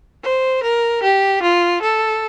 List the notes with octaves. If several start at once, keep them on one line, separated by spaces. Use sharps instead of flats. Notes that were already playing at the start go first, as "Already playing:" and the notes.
C5
A#4
G4
F4
A4